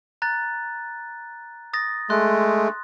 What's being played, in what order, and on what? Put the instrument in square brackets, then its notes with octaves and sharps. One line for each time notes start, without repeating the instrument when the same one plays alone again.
[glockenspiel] A#5 F#6 A6
D#6 A6 A#6
[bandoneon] G#3 A3 [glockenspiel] C6 F#6